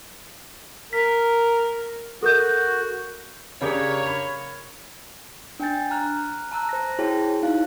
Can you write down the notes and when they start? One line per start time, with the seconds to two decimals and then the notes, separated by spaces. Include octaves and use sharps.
0.93 A#4 B6
2.23 F#4 A4 A#4 G6
3.61 C#3 A#3 D4 G4 C#5
4.06 B5
5.60 D4 G5 G#5 G6 A6
5.91 A#5 F6 F#6
6.52 A5 A#5 E6 F#6
6.69 C5 A#6
6.99 E4 F#4 G#4 C#5 G5 A5
7.43 D#4 E4 F5 F#6